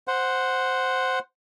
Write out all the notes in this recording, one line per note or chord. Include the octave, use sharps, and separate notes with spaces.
C5 F#5